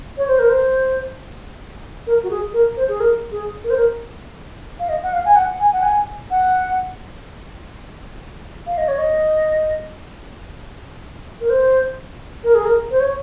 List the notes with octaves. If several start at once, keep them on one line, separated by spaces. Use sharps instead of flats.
C#5
C5
A#4
C5
A#4
F#4
G#4
A#4
C5
G#4
A#4
G#4
A#4
C5
A#4
F5
D#5
F#5
F5
G#5
F#5
G#5
F#5
G#5
F#5
F5
D#5
C#5
D#5
A#4
C5
A#4
G#4
A#4
C5
C#5